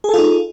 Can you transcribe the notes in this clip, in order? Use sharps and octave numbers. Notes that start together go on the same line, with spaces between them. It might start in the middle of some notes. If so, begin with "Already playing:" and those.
D#4 F4 G#4 A4